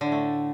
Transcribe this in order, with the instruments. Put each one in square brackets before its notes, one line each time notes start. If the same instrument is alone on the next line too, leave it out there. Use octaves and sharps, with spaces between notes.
[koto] D3
A2
A3